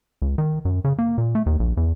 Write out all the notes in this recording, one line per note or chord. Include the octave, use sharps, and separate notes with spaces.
C#2
D#3
F#2
C#3
A#3
A#2
A3
D#2
A#1
E2